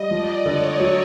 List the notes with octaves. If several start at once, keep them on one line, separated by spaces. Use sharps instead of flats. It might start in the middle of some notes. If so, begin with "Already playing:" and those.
Already playing: G3 D#5
F3 D5
D3 C#5
F#3